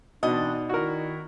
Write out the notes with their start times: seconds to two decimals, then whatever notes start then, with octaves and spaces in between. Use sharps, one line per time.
0.23 B2 E3 C4 D4 D#4 D5 D#5
0.69 D#3 E4 F#4 A#4